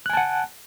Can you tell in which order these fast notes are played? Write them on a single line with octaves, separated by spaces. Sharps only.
F#6 G#5 A5 F#5